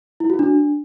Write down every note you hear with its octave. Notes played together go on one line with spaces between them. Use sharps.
E4
F#4
D4